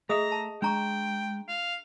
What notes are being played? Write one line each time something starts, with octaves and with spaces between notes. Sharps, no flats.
A3 G#4 D#5 E5 A#5 D#6
A5
G#3 D4 G5 A#5 C#6
F5